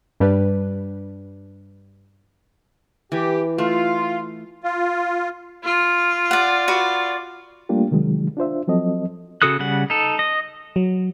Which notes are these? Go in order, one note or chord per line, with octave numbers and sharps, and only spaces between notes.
G2 G3 D4 B4
E3 G4
A3 F4
F4
F4
D5 F#5
F#4 B4 D5
G3 A3 A#3 D4 F4 G4
C3 D#3 F#3 G#3
D4 F4 C5 E5
F3 F#3 C4 A4 D#5
C#3 F#4 A4 D#6 F#6
C#3 G3 F#5
D#4 A4
D#5
F#3